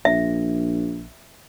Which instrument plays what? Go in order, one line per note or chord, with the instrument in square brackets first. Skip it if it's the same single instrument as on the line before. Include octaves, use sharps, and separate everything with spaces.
[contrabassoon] A#1 [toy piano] E5